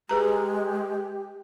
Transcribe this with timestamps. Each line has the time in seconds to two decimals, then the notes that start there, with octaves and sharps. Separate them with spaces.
0.09 G#3 G4 G#4 B4 A#5